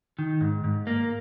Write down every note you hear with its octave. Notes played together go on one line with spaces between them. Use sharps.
D#3
G#2
G#2
A#3